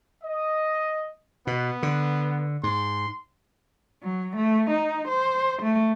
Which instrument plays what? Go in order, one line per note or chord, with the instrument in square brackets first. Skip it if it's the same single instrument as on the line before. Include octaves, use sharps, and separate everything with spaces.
[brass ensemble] D#5
[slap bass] B2 [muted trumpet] B3
[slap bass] D3
[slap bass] G#2 [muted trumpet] C6
[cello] F#3
A3
D#4
C5
A3